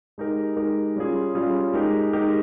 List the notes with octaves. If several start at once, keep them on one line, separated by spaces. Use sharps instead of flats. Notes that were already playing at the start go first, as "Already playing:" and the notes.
G#3 D#4 G4 A#4
G#3 D#4 G4 A#4
G3 C#4 F4 G#4
G3 C#4 F4 G#4
G#3 D#4 G4 A#4
G#3 D#4 G4 A#4